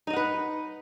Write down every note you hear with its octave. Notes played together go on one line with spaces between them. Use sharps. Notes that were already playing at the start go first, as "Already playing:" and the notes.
D#4 B4 D#5 F#5